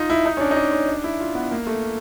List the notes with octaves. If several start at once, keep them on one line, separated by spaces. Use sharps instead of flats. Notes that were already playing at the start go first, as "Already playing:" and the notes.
Already playing: D#4 F4
E4
D#4
C#4
D4
D#4
D4
C#4
D4
E4
F4
B3
A#3
A3